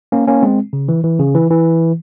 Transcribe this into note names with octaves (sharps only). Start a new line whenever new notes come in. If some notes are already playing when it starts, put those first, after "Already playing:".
A#3 C#4
A#3 C#4
G#3 C4
C#3
E3
E3
C#3
E3
E3